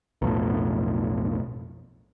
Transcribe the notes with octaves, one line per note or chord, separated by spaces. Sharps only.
B1 F2 A2